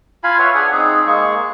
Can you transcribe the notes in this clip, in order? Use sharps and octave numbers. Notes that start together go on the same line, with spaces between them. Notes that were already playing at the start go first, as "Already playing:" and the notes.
F4 F5 G#5 B5
B4 C#5 E5 F#5
D4 G#4 F#5 G#5
C4 D#4 G#4
G#3 A#3 G#4 C#6